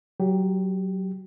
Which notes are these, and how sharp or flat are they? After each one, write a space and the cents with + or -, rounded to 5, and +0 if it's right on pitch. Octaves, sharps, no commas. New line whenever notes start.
F#3 +20 G4 +0